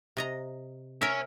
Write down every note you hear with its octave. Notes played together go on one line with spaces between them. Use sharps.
C3 D#5 A#5
C#4 A#4 E5